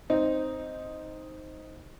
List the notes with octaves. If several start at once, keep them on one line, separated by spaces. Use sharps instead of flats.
C4 D#4